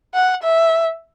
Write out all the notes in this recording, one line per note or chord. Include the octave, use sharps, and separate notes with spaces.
F#5
E5